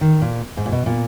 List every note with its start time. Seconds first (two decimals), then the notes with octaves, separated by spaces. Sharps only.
0.01 D#3
0.22 A#2
0.57 G#2
0.66 A#2
0.72 B2
0.86 A#2